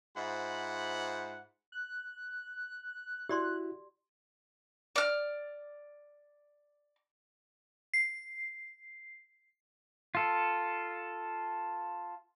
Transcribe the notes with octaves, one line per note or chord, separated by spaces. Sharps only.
G#2 F4 C5 E5 F#5 B5
F#6
E4 F#4 G4 D5 C6
D5 F6
C7
F4 A4